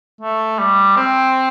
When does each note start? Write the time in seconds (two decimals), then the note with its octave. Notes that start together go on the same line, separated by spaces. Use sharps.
0.21 A3
0.59 G3
0.96 C4